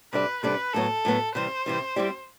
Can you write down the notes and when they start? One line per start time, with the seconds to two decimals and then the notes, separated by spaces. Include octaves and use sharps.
0.13 C3 G3 D4 A4 B4 D5
0.43 C3 G3 D4 A4 B4 D5
0.74 A2 F#3 B3 A4
1.05 A2 F#3 B3
1.35 C3 E3 G3 C5
1.66 C3 E3 G3
1.96 G3 C4 E4 G4 D5